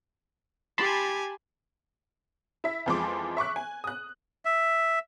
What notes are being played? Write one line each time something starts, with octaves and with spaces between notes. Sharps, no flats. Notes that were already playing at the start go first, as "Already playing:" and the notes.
G4 G#5 A5 B5 C6
E4 E5
F2 E3 F3 G#3 C6 D6
E5 C#6 D6 F#6
G#5
D#6 F#6
E5